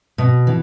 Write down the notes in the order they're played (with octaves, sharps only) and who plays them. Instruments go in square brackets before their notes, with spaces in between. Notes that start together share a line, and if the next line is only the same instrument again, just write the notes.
[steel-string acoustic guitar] B2
E3